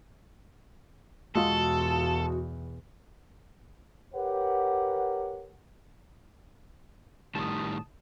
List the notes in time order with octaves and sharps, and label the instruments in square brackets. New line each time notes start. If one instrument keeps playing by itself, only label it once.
[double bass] E2 B2 [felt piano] G#3 F4 [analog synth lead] F#4 [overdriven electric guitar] A4
[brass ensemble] G4 A#4 B4 C#5 F#5
[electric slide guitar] A2 D#3 G3 [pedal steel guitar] A5 D#6